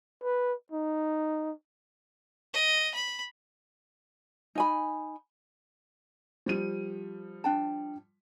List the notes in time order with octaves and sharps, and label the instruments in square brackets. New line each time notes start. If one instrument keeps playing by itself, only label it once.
[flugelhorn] B4
D#4
[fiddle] D#5
B5
[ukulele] D#4 G#5 B5
[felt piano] F3 G3 D#7
[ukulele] D4 G5 A5